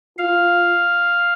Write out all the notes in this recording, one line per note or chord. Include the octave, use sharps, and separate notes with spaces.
F4 F5